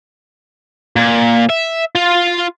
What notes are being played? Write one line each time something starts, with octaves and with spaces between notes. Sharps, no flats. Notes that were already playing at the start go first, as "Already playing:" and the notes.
A#2
E5
F4